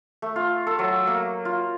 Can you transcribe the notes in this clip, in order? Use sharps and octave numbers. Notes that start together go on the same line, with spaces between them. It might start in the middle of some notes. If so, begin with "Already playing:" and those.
A3
F4
A4
F#3
A#3
F4